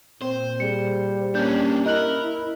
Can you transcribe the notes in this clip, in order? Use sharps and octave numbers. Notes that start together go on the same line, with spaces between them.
A#2 C4 C5
G3 G#4 C#7
A#3 C#4 D4 G6
E4 A#4 D#5 F#6 F#7